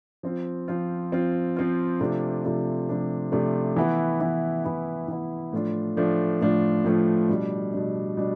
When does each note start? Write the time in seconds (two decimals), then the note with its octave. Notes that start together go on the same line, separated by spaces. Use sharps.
0.23 F3 C4 F4
0.68 F3 C4 F4
1.12 F3 C4 F4
1.56 F3 C4 F4
2.00 C3 F3 A3 D4 F4
2.44 C3 F3 A3 D4 F4
2.89 C3 F3 A3 D4 F4
3.32 C3 F3 A3 D4 F4
3.76 E3 B3 E4
4.20 E3 B3 E4
4.64 E3 B3 E4
5.08 E3 B3 E4
5.53 A2 F3 A3 D4 F4
5.97 A2 F3 A3 D4 F4
6.41 A2 F3 A3 D4 F4
6.84 A2 F3 A3 D4 F4
7.29 B2 G3 D4
7.74 B2 G3 D4
8.17 B2 G3 D4